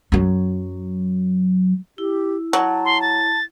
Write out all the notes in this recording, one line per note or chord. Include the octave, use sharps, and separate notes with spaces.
F#2 F#3
E4 G4
F#3 A5
C6
A6